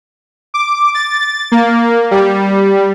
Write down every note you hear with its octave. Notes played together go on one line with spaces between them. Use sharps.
D6
A6
A#3
G3